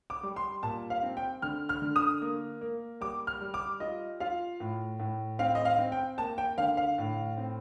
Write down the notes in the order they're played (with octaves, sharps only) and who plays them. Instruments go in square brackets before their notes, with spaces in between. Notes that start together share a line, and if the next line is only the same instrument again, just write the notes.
[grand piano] D6
G3
C6
A#2 A5
F5
C4
G5
D3 F6
F6
D3
D#6
A#3
A#3
G3 D6
F6
G3
D6
F4 D#5
F4 F5
A2
A2
C4 F5
D#5
F5
C4
G5
A#3 A5
G5
D3 F5
F5
A2
C4